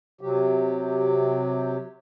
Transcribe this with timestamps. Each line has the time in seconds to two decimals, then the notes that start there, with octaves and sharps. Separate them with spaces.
0.21 C3 F#3 G4